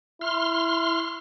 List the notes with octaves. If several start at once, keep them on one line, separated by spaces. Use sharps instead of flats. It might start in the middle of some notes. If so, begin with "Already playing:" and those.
E4 C6 F6